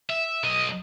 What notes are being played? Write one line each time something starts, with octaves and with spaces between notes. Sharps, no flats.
E5
B1 D#5